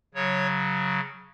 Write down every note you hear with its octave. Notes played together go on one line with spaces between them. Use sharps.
C#3 F#3 C#5